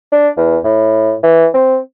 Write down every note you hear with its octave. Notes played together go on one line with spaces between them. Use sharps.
D4
E2
A2
E3
C4